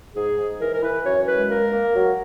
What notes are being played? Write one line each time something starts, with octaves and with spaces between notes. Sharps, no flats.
G#2 G#4
G#2
E3 A#4
A#4
E3 B4
F#2 C#5
G#3 B4
A#3 A#4
A#3
F#3